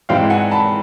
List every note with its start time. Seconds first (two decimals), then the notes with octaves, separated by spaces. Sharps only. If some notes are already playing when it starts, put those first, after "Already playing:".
0.09 G#2 E3 G#3 C4 F5 G5
0.30 F#5 G#5
0.51 A5 B5